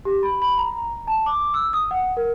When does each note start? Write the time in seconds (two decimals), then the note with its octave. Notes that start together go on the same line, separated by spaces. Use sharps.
0.05 G4
0.23 B5
0.42 B5
0.58 A#5
1.07 A5
1.26 D6
1.54 E6
1.73 D#6
1.91 F#5
2.17 A#4